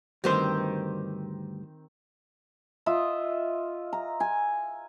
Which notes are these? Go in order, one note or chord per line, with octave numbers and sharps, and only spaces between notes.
D2 G2 D#3 C4 G4 C5
F4 D#5 E5
A#5
G#5